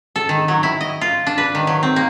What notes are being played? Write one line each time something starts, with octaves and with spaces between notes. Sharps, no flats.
A4
D#3
F#3
E4
D#5
F4
D4
B4
D#3
F#3
C4
A#3